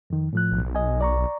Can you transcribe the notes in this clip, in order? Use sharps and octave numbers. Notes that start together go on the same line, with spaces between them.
F2 D#3
A2 F3 F#6
B1
D#5 G#5
D5 A#5 C#6